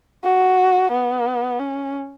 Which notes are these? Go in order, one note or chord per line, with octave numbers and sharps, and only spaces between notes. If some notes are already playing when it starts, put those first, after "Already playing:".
F#4
B3
C#4